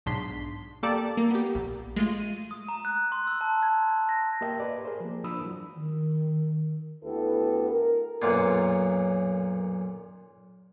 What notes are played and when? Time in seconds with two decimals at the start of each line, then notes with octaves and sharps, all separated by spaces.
0.06 B1 G#2 D4 C6 B6
0.83 A#3 G4 A4 D5
1.17 A#3
1.31 B3 G4
1.55 A#1
1.96 G#3 A3 F4
2.20 D#7
2.51 D#6
2.68 A#5
2.85 F#6
3.12 C6
3.27 E6
3.41 A5
3.63 G#6
3.89 G#6
4.09 A#6
4.41 A#3 G4 A#4 D#5 E5 G5
4.60 G4 B4 D5
4.85 G#4 A#4 C5
5.00 F3 A#3
5.24 F3 D4 B5 D#6 E6
5.42 E3 F#3
5.76 D#3
7.03 D2 B3 E4 G4 A4 B4
7.70 A#4
8.22 B1 F#2 A#2 A#3